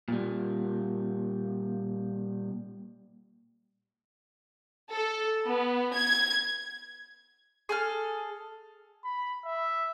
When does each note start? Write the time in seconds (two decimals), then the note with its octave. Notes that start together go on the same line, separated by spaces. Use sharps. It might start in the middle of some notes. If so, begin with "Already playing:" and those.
0.08 A#2 G3
4.92 A4
5.47 B3
5.95 G#6
7.69 G#4 A4 F6
9.04 B5
9.45 E5